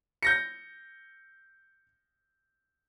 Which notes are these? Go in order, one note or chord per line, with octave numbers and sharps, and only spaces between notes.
G6 A#6 C#7